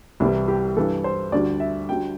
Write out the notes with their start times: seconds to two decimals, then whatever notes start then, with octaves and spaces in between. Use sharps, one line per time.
0.20 C2 C3 E3 G3 E4
0.48 G4
0.77 G2 E3 G3 A4
1.04 C5
1.32 D2 D3 G3 D5
1.60 E5
1.89 D2 D3 G3 G5